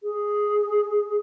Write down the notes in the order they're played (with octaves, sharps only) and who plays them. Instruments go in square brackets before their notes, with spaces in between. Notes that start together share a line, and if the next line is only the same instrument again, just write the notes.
[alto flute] G#4